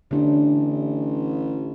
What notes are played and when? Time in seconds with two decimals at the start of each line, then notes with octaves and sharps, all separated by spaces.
0.11 A1 D3 D4